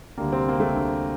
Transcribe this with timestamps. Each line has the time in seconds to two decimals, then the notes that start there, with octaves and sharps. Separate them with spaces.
0.18 D2 D3 G3 A#3
0.32 C3 C4
0.49 A#3
0.60 A3
0.74 D2 D3 G3